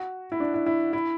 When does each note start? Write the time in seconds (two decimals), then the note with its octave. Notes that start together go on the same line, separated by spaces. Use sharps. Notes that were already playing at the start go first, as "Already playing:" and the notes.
Already playing: F#4
0.32 E4
0.40 D4
0.54 E4
0.66 E4
0.93 E4